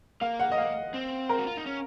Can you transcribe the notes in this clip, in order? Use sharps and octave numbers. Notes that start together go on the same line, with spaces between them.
A#3 F5
F#5
D#5
F5
C4
A#4
F#4
F4
D#4
C#4